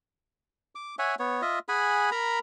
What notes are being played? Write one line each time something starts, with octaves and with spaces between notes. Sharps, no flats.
D6
C#5 E5 F#5 G#5
B3 C#5
F4 D#5 E5
G#4 F#5 G#5 B5
A#4 A#5 B5